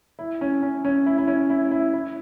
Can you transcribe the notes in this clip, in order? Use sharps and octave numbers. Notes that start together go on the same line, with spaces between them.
E4
C#4
C#4
C#4
E4
E4
C#4
E4
E4
E4